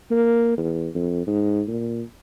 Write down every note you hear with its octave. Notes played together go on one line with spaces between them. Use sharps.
A#3
E2
F2
G#2
A#2